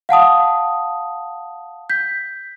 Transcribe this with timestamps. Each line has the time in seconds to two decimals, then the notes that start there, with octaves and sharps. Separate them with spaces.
0.09 F5 F#5 A5 D#6
1.90 G6 B6